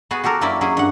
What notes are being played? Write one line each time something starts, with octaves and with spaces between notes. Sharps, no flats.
B3 F#4 G#4
F#4 G4 A4 A#4
F#2 A#3 C#4 E4 D5 B5
F#3 C#4 E4 G#4
G2 F#5